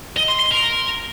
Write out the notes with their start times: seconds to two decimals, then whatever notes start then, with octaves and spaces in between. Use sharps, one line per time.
0.17 D#5
0.28 C6
0.39 C6
0.51 A#4